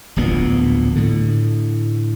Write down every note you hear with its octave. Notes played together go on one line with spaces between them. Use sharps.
D1 A#1 A#2 B3
A2 D3